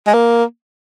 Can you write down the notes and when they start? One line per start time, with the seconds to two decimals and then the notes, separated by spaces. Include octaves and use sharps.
0.07 G#3
0.14 A#3